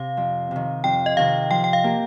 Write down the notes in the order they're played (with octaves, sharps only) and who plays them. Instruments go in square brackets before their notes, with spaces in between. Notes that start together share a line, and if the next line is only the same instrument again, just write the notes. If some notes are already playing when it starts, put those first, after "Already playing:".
Already playing: [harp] C3 [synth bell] F5
[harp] F2
C3 D#3
[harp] F2 [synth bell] G5
[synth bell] D#5
[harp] C3 D#3 [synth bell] F5
[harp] F3 [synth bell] G5
[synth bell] G5
F5
[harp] A#3 G4 A#4